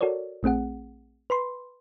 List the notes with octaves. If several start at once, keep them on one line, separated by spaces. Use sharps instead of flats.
F#4 A4 A#4 C#5 D5
A#1 A3 C4 G#4 F#5
B4 B5 C6